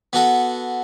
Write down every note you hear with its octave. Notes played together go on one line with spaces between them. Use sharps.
B3 F#4 A4